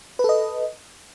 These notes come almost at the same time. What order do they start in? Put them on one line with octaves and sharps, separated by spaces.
B4 A4 D#5